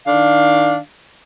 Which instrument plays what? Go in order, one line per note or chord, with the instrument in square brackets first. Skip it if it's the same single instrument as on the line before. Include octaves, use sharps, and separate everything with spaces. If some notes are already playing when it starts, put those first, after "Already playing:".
[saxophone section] D#3 D4 F5